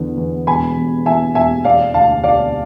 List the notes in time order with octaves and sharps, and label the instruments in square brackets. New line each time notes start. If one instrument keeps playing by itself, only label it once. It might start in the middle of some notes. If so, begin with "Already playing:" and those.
Already playing: [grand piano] E2 D3 B3
E2
[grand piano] E1 [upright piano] G#5 B5
[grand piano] E2
[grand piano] E2 [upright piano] E5 G#5
[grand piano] E1 [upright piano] E5 G#5
[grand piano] E1 [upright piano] D5 F5
[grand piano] D2 [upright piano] F5 A5
[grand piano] E1 [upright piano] D5 F5